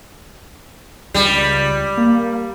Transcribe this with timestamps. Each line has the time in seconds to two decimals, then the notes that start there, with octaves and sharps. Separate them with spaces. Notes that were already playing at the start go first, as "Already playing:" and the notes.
1.14 C#2 G3
1.97 A#3